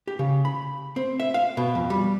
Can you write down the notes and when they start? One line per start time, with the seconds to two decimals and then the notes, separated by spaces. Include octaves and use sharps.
0.07 G4
0.19 C#3
0.45 B5
0.96 C4
1.20 E5
1.34 F5
1.57 B2
1.75 F2
1.90 G3